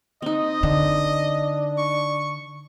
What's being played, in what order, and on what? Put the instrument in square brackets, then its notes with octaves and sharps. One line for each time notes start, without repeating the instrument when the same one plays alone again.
[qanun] C4 D#4 [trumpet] D#5
[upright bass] D3 [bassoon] D4
[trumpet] C#6